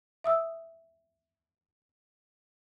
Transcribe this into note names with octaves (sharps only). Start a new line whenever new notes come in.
E5 D#6 E6